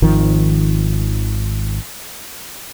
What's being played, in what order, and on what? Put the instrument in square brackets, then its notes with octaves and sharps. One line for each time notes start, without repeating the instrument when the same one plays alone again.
[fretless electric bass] G#1 D#3 F3